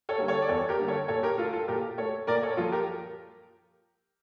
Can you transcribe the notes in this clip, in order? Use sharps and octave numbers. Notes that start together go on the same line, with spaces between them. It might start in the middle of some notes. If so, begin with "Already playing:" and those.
A4 C#5
D3 G3 A#3
A4 C#5
D5
E2 A4 C#5
G4 A#4
D3 G3 A#3
A4 C#5
A#2 A4 C#5
G4 A#4
A3 F4 A4
F4 A4
A#2 G4 A#4
A3 A4 C#5
A#2 A#4 D5
A4 C#5
F3 A#3 F4 A4
G4 A#4